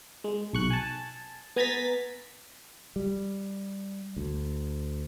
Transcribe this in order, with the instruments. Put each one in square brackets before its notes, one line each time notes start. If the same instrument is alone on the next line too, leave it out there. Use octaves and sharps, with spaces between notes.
[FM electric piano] G#3
B1 C#6 F#6
G#5 A5
B3 G#5 A#5 G#6 A6 B6
[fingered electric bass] G3
D2